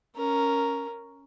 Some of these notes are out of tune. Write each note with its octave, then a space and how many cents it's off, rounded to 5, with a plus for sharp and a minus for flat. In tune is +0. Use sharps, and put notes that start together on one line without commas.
C#4 +0 A#4 +0